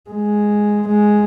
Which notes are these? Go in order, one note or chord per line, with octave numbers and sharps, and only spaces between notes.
G#3
G#3